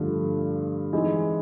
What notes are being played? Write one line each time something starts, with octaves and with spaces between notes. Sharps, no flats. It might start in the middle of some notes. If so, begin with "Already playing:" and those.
Already playing: G2 D3 F3 A3
E3 G#3 C4 D#4